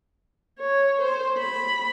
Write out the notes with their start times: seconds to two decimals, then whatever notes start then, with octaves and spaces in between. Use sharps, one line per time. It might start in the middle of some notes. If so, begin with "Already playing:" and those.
0.60 C#5
1.01 C5
1.38 B5